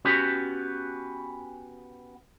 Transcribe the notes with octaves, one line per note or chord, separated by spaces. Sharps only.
B3 C#4 F#4 G4